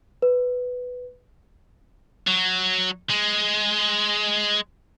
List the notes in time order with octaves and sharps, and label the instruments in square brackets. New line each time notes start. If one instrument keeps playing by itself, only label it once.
[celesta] B4
[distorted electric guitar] F#3
G#3